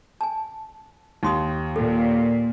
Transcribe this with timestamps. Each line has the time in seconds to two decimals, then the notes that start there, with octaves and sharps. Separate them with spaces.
0.21 G#5 A5
1.23 D#2 D#4 C6 D#6
1.76 A#2 A4